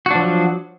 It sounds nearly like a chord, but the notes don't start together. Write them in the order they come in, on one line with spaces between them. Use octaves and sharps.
F#4 D4 F3 F#3